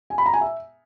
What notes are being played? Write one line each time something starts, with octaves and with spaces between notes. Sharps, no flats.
G#5
B5
A#5
G#5
E5